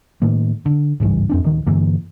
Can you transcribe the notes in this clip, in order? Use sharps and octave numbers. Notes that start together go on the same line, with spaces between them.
A2 D#3 A#3
D3
G#1 C#2 G2 E3
F2 C4 D4
D1 D#3
G2 D3 E3 A#3